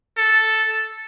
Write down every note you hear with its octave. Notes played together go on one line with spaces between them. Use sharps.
A4